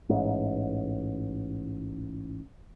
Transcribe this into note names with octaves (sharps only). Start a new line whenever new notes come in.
A1 G#2